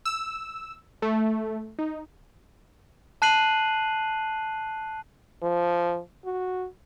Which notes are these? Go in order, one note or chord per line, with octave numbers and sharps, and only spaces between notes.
E6
A3
D#4
A5 F#6 C7 D#7 F#7
F3
F#4